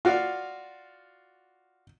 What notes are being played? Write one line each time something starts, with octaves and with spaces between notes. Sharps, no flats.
F4 F#4 D5 F5